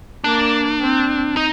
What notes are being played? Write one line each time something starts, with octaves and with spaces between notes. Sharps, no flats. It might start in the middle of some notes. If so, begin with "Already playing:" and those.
A#3 D4
C4
D#4